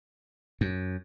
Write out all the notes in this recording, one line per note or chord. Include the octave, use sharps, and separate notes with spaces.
F#2